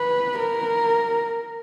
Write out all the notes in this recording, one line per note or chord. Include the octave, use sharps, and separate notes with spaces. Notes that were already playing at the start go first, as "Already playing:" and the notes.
Already playing: B4
A#4